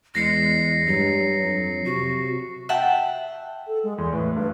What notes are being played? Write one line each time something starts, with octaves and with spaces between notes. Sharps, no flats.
E2 G#3 A#6 C7 C#7
G2 F#3
F2
C3 F#4
E5 F#5 G5 A5
A4
G#3
E2 C6
A2 B4
G2 B4